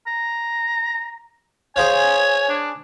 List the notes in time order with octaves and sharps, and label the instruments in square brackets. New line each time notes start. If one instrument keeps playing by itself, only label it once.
[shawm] A#5
[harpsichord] G#4 C5 F5 [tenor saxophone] C#5 [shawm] G#5
[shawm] D4